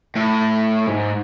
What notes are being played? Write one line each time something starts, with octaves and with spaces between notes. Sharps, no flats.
A2
G#2